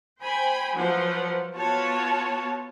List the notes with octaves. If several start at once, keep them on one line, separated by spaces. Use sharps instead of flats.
C5 G5 G#5 B5
F3 F#3 B4 C5 F#5
B3 F4 F#4 C#5 A5